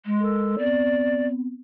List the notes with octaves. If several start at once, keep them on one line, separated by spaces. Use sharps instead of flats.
G#3
A4 A#4 E6
B3 C4 D5